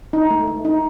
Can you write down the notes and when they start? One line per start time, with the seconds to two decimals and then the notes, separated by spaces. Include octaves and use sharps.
0.13 D#4
0.30 A3
0.47 A3
0.65 D#4